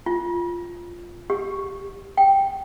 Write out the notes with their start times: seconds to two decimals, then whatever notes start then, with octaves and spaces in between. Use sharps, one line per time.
0.06 F4
1.30 G4
2.17 G5